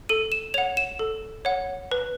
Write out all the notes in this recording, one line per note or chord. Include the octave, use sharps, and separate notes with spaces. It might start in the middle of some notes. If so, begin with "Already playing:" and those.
A4 D#7
E7
C#5 F#5 F7
E7
A4
C#5 F#5
B4